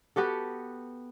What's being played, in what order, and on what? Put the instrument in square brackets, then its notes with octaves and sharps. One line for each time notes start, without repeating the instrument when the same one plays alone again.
[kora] B3 F#4 G4 A4